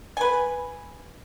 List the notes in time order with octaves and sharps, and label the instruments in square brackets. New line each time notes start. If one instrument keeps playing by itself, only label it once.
[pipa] B4 G#5